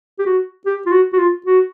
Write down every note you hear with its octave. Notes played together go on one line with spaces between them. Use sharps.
G4
F#4
G4
F4
F#4
F#4
F4
F#4